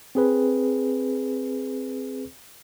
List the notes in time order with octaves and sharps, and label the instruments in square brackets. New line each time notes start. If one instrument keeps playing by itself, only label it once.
[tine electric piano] C4 G#4 B4